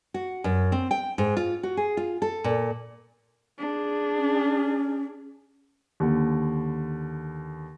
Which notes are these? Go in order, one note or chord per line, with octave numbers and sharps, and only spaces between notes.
F#4
F#2
C4
G5
G#2
F4
F#4
G#4
F4
A4
A#2
D4 G#4
C#4
D#2 D3